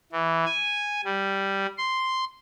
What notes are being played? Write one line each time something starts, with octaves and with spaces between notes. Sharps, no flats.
E3
G#5
G3
C6